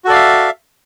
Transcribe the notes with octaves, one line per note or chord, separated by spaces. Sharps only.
F#4 A4 D5 E5 F5